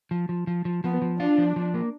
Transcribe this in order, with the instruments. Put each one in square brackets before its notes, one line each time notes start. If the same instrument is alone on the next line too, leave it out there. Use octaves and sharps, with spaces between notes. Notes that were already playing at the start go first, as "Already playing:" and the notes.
[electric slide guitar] F3
F3
F3
F3
[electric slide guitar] F3 [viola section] B3
[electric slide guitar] F3
[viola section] D4 [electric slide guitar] F4
[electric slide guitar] F3
F3
A#3